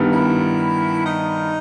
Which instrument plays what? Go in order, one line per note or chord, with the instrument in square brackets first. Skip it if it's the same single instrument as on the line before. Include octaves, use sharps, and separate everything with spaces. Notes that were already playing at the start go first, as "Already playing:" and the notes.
Already playing: [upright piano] G2 D#3 G3 B3
[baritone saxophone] E4
D#4